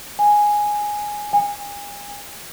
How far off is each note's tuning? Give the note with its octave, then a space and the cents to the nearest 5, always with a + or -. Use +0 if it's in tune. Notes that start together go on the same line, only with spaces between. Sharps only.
G#5 +0
G#5 -35